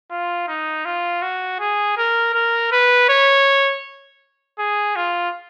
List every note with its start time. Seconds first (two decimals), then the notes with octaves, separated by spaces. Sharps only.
0.10 F4
0.48 D#4
0.85 F4
1.22 F#4
1.60 G#4
1.97 A#4
2.34 A#4
2.72 B4
3.09 C#5
4.59 G#4
4.96 F4